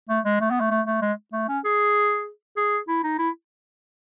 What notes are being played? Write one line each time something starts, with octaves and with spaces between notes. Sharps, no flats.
A3
G#3
A3
B3
A3
A3
A3
G#3
A3
C#4
G#4
G#4
E4
D#4
E4